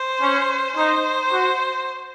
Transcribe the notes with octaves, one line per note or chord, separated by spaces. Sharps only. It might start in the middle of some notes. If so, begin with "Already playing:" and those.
Already playing: C5
C#4
D#4 C5
F#4